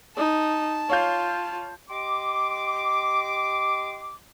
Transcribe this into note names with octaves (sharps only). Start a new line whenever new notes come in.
D#4 A5
F4 C#5 F5 G6
G4 D#5 C6 D6